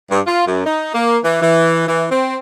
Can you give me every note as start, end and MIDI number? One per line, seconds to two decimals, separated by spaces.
0.11 0.20 43
0.26 0.46 65
0.47 0.64 42
0.66 0.90 63
0.94 1.18 58
1.24 1.40 52
1.42 1.85 52
1.88 2.06 52
2.11 2.37 60